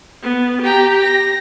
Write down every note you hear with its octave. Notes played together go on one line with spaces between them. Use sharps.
B3
G4 G5 A#5
A#6